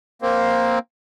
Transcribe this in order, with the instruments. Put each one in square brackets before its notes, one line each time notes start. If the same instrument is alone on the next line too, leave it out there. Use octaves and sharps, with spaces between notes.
[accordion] A#3 C4